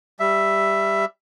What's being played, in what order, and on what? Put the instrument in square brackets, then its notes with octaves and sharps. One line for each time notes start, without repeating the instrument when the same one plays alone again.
[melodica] G3 E5